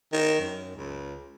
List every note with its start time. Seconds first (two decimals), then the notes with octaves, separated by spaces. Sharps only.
0.13 D#3
0.41 F#2
0.76 C#2